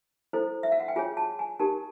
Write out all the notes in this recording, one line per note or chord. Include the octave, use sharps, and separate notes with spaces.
E4 A4 C5
E5
F5
F#5
G5
F4 G#4 C#5 G#5
A5
G#5
D#4 G4 A#4 A5